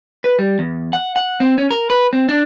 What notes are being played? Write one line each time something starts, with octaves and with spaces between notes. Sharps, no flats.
B4
G3
E2
F#5
F#5
C4
C#4
A#4
B4
C4
D4